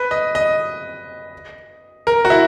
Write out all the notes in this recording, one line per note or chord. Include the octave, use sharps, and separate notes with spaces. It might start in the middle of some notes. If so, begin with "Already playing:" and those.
Already playing: B4
D#5
D#5
A#4
F#4
E4